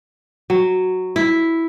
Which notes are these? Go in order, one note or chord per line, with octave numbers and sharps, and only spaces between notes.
F#3
E4